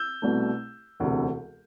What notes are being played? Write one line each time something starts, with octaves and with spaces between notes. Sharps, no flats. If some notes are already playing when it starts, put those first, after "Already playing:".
Already playing: E6 G6
C2 B2 A3
E1 D2 C3